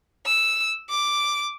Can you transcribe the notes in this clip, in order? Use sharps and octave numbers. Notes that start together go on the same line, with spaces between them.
E6
D6